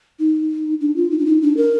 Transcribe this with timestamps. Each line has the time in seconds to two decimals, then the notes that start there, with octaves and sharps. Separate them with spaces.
0.19 D#4
0.81 D4
0.96 F4
1.11 D#4
1.19 D4
1.26 D#4
1.42 D4
1.57 A#4